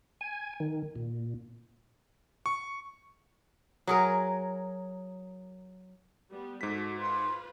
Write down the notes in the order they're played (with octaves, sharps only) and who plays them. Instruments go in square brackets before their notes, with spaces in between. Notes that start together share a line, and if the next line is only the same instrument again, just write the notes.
[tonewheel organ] G#5
D#3
A#2
[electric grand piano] C#6
[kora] F#3 G#4 A#4
[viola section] G3 B3
[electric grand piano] G#2 B6 [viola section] F#4 A4
[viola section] F4 B4 C5 [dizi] C6